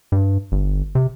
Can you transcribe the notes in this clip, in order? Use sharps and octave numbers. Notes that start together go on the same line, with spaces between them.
G2
G1
C3